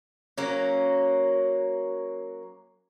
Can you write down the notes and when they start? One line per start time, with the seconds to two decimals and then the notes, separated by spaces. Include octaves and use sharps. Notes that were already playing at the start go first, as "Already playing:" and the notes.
0.38 F#3 A#3 C#4